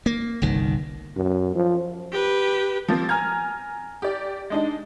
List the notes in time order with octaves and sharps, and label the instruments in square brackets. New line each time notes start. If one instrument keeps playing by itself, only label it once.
[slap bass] A#3
G1 C2 D#3
[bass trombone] F#2
F3
[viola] G4 B4
[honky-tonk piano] F3 A#3 C4
G#5 A#5 F6 G#6
G4 D5
G#3 D4 D#4